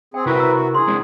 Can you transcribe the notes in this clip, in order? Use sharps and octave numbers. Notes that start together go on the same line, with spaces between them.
C4 G#4 G5
C3 E4 F#4 A#4 B4
A#5 E6
F#4
E4 G#4 C6
G#3 C4 D4